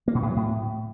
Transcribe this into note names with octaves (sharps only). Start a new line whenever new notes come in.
A#3
B2
A2
F#3
A2